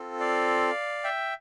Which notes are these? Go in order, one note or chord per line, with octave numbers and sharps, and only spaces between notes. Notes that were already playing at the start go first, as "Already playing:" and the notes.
Already playing: C4 F4 A4
D5 F5
E5 G5